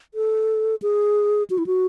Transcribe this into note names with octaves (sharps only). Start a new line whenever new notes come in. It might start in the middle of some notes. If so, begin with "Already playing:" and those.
A4
G#4
F#4
E4
F#4